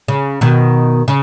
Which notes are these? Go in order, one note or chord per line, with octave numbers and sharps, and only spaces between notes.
C#3
B2 D#3
C#3